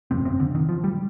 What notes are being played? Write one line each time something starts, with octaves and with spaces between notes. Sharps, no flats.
G1 F2 C3 C4
C4
D3
D#3
F3
G3